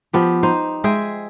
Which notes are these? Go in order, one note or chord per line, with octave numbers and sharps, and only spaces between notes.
F3 B3 G4
D#4 C5
G#3 G#4 E5 G5